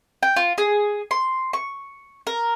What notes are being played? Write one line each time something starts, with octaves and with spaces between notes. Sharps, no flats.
G5
F4
G#4
C6
C#6
A#4